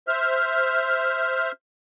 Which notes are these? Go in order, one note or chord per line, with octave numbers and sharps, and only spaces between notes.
C5 E5 F6